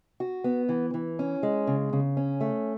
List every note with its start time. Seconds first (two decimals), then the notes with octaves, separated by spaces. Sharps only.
0.20 F#4
0.44 B3
0.69 E3
0.94 E3
1.19 C#4
1.43 G#3
1.67 C#3
1.93 C#3
2.17 C#4
2.41 A3